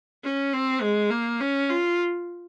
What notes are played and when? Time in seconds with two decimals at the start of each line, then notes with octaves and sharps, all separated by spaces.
0.24 C#4
0.54 C4
0.82 G#3
1.11 A#3
1.41 C#4
1.70 F4